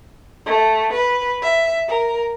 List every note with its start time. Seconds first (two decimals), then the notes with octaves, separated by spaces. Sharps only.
0.46 A3
0.93 B4
1.42 E5
1.87 A#4